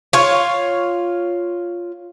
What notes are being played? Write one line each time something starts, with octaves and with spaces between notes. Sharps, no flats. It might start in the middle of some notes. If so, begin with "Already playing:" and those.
F4 C#5